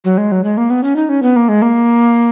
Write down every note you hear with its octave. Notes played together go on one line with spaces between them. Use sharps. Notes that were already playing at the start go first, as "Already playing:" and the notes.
F#3
G#3
F#3
G#3
A#3
B3
C#4
D#4
C#4
B3
A#3
G#3
A#3